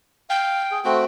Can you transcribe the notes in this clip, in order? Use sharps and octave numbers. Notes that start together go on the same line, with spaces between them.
F5 G5
G#4
A3 C4 F#4 G5